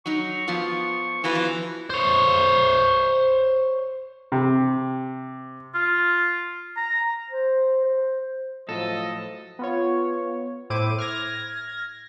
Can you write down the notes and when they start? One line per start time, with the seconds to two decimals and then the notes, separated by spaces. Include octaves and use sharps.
0.06 F#3 D#4 C#6
0.48 F3 B3 F4
1.24 E3 B3 F4 F#4 B4
1.35 F3
1.90 C5 C#5
4.32 C3
5.75 F4
6.77 A#5
7.31 C5
7.85 C5
8.69 A2 F3 F#3 A3 A4 D#5
9.59 B3 F4 C#5
10.70 A2 E4 C5 D6 D#7
10.98 F6 G#6 A#6